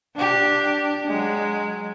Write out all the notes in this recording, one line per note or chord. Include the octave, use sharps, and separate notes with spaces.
D4 G4
F#3 G#3